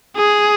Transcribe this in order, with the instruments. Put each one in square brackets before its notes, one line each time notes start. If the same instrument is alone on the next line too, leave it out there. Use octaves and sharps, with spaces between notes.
[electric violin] G#4